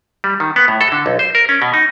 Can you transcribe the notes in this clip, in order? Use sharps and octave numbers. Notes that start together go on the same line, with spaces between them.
G3
D#3
B3
A2
A4
D3
B1
C5
A#4
C#4
B2
D#4